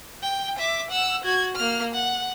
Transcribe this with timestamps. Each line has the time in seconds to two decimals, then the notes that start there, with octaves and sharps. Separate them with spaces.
0.23 G5
0.58 E5 D6
0.91 F#5 E6
1.24 F#4 G#6
1.56 A#3 F6
1.94 F#5